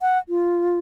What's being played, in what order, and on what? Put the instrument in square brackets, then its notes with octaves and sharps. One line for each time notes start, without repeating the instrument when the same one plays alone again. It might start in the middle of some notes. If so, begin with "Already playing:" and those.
[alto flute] F#5
F4